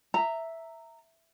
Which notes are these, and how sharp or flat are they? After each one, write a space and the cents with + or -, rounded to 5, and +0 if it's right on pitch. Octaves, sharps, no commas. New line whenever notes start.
E5 +0 A#5 -15